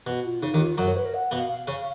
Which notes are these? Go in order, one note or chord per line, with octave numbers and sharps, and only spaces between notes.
B2
F4
C#3 D#4
D#2 D#3
F4
F#2 F#3 F#4
C#5
B4
A#4
F#5
B2 B3 F5
F5
C#3 C#4